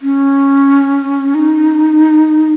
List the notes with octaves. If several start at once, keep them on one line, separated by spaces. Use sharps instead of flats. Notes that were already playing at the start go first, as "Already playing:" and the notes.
C#4
D#4